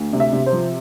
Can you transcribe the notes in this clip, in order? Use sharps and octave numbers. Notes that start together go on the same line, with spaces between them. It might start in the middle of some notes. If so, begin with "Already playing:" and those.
Already playing: D2
C3
E5
C3
C5
F3